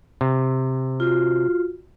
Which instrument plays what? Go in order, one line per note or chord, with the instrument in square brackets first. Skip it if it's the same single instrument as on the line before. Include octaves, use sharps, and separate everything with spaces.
[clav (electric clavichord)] C3
[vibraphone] F4 F#4